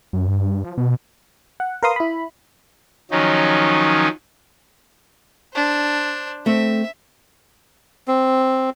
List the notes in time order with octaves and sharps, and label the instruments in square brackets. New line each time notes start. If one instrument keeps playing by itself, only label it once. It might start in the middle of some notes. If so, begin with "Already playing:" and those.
[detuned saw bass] F#2
G2
F3
B2
[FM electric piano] F#5
A#4 B4 F5 C6 D#6
E4 B5
[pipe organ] D#3 F3 F#3 C#4 D#4
[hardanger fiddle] D4 C5
[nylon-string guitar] A3 C4 [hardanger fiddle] E5
[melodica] C4